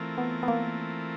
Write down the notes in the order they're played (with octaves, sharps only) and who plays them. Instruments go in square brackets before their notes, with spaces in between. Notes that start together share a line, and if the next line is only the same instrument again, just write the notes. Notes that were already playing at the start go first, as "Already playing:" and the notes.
Already playing: [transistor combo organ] E3 A3 C4 F4 A#4
[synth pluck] B3
B3
A#3